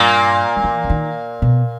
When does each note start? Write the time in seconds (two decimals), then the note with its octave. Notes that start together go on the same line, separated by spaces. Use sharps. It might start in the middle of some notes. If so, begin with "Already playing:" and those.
Already playing: G2 A#2 A#3
0.57 G3
0.64 E3
0.84 C#3
0.90 D#3
1.42 B2